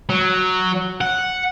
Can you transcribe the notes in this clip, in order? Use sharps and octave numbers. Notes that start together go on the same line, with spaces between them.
F#3
F#5